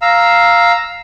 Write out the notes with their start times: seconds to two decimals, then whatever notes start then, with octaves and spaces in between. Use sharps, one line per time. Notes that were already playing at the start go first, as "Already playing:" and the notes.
0.02 F5 A#5 E6